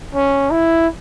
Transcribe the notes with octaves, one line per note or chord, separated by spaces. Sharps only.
C#4
E4